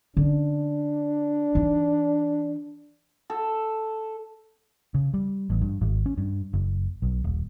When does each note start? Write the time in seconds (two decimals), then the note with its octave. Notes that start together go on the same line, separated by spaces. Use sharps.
0.17 D3 C#4 D4
1.55 E3 D#4
3.30 A4
4.94 C#3
5.14 G3
5.50 A1
5.62 G2
5.81 G#1
6.06 C#4
6.18 G2
6.53 F#1
7.02 B1
7.24 D#1